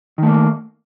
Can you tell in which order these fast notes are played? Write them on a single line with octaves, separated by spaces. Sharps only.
D#3 A3 A#3